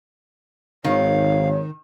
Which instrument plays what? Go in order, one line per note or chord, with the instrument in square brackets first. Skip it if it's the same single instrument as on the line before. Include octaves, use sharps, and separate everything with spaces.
[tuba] G#1 [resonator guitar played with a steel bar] D#3 [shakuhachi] C#5 [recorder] F5